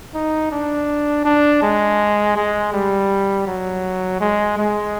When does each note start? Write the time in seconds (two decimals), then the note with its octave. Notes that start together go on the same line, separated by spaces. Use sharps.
0.15 D#4
0.52 D4
1.25 D4
1.62 G#3
2.37 G#3
2.73 G3
3.47 F#3
4.21 G#3
4.58 G#3